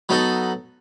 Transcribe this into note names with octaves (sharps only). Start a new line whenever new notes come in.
F#3 B3 D#4 A4